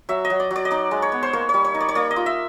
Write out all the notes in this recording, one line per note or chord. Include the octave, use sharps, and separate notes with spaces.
F#3 E5
D#5
F#3
D5
F#3
D5
D#5
D#4 D5
G#3
C#5
B3
C5
A#3 C#5
C#5
G3
C#5
D#4
D5
C#5
A#3 D5
D#5
F4
E5